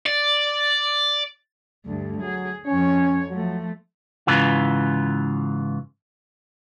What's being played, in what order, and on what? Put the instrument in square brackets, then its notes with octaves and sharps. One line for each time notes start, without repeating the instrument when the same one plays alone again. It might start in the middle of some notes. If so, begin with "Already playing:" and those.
[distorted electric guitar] D5
[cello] D2 G2
[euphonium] F#3 [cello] G#4
[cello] F2 C#5 [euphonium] C#4
[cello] F3 A3 [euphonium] F#3
[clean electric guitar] G#2 C#3 E3 F4